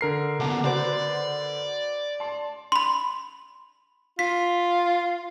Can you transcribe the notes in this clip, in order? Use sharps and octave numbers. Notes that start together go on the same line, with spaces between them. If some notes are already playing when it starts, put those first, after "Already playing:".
D3 A#4 C7
C#3 B3 F#5 A5 D6
F#4 B4 C5 D5
A5 C6
B5 C6
F4 B6